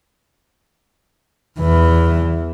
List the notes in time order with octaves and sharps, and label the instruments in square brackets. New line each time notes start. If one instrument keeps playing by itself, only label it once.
[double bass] E2 E3